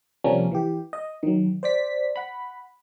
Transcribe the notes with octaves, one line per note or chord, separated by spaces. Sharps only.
C3 F3 G3 A#3 C#4 D4
E3 G4
D#5
D#3 F#3
C5 D5 B6
F#5 B5